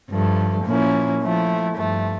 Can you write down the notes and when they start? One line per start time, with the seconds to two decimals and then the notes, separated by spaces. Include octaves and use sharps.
0.10 G2 F3 A3
0.66 A#2 F3 A#3 C#4 E4
1.22 F3 A3 E4
1.77 G2 F3 A3